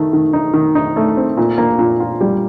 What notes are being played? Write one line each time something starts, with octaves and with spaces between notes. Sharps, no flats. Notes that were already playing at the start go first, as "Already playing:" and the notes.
Already playing: D#3 A3
D#3
D#4
D#3
D#4
A3
C4
A#2
A#3
A#2
F4
G3